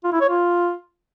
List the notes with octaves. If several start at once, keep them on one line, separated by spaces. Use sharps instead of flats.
F4
E4
C#5
F4